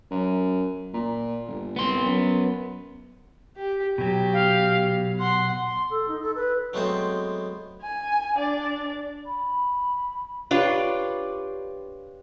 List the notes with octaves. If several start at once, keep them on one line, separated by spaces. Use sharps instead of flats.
F#2
A#2
G1
C2 B3 C6
F#2
G4
B2 F#3 G4
F5
F#5 C6
C6
A4
D#4
A4
B4
F#3 G#3 A3 B3 C4 C5
G#5
D4 D5
B5
D4 F4 G4 B4 C#5